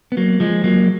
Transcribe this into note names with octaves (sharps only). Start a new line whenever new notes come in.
B3
F#3 A#3
F3 G#3
F#3 A#3